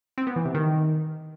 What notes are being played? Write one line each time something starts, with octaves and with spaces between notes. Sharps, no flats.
C4
B3
E3
C3
D#3